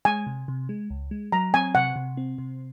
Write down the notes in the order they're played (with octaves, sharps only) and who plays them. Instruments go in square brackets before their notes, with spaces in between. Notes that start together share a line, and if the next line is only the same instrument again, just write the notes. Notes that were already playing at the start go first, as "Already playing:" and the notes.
[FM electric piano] G#3 [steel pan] G#5
[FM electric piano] C3
C3
G#3
C#2
G#3
[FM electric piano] F#3 [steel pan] A#5
[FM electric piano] C4 [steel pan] G#5
[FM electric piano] C3 [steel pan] F#5
[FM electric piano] C3
C4
C3